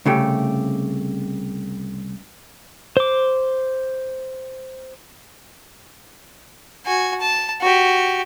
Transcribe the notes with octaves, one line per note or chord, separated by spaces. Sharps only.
C2 C#3 A3 G4
C5 D6
F#4 G#5
A5
F#4 G4